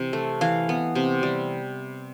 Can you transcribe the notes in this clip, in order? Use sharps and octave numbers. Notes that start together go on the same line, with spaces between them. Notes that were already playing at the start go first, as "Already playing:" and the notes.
Already playing: C3 E3
A3
E3 F5
B3
C3
G3